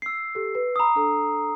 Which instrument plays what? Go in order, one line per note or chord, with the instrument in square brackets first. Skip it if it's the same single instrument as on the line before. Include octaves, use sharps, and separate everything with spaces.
[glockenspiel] E6 C7
[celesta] G4 A4
B4
[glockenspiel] A#5 D#6 [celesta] B5 E6
[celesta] D4 A4